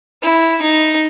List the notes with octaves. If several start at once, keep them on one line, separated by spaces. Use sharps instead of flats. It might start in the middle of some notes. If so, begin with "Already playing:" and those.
E4
D#4